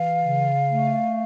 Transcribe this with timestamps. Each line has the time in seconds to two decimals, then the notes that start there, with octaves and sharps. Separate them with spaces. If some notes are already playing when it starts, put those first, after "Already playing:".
Already playing: E3 F5
0.21 C#3
0.69 A3